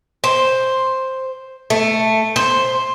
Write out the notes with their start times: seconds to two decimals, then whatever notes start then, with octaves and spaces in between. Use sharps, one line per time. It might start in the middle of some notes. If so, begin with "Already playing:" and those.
0.24 C5
1.70 A3
2.36 C5